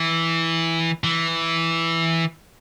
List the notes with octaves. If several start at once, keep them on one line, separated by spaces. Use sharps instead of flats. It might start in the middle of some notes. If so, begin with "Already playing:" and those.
Already playing: E3
E3